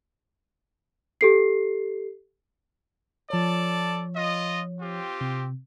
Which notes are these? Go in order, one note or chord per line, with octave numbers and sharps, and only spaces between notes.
G4 A4 C7
F3 A4 C#5 D5 A5
F4 D#5
C4 F4 G4
C3